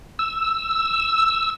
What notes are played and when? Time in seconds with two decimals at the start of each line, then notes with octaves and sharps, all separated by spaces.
0.19 E6